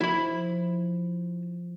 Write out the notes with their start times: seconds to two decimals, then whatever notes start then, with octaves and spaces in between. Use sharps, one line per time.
0.01 F3 E4 B5